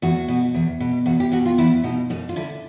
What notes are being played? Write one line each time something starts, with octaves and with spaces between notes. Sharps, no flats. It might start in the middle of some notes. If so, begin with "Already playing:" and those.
E2 F#4
B2
E2
B2
E2 F#4
G4
B2 F#4
F4
E2 E4
B2 D#4
F#2 D#4
F4
D3 E4